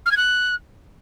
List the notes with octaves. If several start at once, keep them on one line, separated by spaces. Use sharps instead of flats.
F6
G#6
F#6